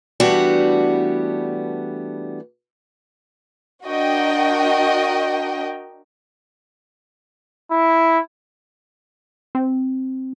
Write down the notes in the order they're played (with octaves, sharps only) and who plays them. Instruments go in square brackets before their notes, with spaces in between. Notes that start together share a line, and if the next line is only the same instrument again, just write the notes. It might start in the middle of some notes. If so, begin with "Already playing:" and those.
[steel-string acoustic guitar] E3 G3 A3 B3 D4 F#4
[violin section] D4 F#4 A#4 D#5 G5
[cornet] E4
[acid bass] C4